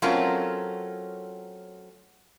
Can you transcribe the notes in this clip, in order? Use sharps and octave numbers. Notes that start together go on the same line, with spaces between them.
F#3 A3 C4 C#4 F4 A#4